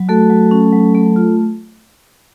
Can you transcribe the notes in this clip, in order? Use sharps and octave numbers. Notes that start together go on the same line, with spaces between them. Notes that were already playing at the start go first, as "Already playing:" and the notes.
Already playing: F#3
A3 F#4 A4
F#3
C#4
F#3
A3
F4